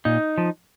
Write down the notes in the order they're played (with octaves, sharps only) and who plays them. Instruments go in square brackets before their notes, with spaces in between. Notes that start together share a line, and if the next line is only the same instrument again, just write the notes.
[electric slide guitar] A#2 D#4
F3